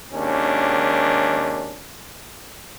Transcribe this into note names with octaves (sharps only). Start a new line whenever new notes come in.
G#1 D#2 C#4 D4